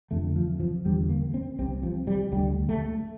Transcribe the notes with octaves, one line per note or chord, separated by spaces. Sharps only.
F2 D3 A3
F3
F3
E2 D3 G3
A#3
C4
C2 C3 C4
F3
G3
D2 D3 G3
A3